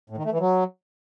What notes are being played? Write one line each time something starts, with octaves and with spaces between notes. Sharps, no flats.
A2
D#3
A3
E3
F#3